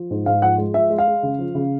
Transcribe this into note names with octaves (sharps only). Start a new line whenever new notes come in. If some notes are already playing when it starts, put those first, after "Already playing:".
Already playing: F3
G#2
G#2 F5
F3 F#5
G#3
F3 E5
G#3
F5
G#3
C#3
F3
C#3